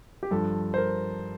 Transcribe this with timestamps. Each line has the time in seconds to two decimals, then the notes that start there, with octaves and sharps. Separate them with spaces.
0.23 G4
0.31 G2 F3 A4
0.74 C5
0.77 A#4